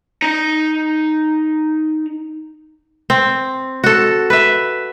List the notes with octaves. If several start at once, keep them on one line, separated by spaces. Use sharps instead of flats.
D#4 A#5
C4
F#4 A4
B4 E5